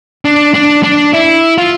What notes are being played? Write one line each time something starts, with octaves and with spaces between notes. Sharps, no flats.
D4
D4
D4
E4
F4